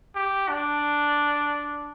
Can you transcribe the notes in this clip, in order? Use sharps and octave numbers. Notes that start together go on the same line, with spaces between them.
G4
D4